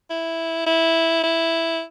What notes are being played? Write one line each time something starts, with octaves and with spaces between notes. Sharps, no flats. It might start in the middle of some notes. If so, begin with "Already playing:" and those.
E4
E4
E4